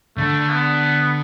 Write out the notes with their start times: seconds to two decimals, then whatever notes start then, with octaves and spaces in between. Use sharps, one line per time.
0.17 D3 A3
0.50 B3